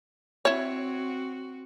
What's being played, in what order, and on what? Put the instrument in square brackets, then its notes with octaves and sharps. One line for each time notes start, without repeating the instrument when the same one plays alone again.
[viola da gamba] C4 F#4 [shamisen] E4 C#5